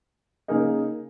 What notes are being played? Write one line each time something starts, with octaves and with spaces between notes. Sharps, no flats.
C#3 A#3 D#4 G#4